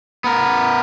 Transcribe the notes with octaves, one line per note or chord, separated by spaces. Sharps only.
B3 A#4